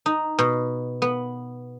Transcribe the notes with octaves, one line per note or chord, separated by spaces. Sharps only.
D#4
B2
B3